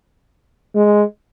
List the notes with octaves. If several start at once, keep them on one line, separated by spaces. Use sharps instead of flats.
G#3